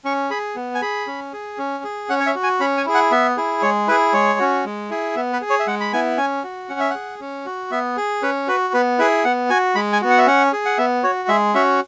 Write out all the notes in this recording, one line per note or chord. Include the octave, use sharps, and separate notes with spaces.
C#4 C#6
G#4 B5
B3
G#5
G#4 B5
C#4
G#4
C#4
G#4
C#4 F#5
C#5
E5
F#4
G#5
C#4 B5
G#5
E4 G#4
F#5
B3 E5
E4 G#4
G#3 C#5
E4 G#4 B4
G#3 C#5
C#4 F#4
G#3
E4 G#4
B3 E5
B4
G#4
C#5
E5
G#3 F#5
B5
B3 E4 G#5
C#4 G#5
F#4
C#4 F#5
E5
G#4 F#5
C#4
F#4
B3 E5
G#4
C#4 B4
F#4 B4
B3 B4
E4 G#4 B4
B3 F#5
F#4 G#5
G#3 B5
G#5
B3 F#4
F#5
E5
C#4 F#5
G#4
F#5
B3 E5
F#4 C#5
G#3 E5
C#4 F#4 E5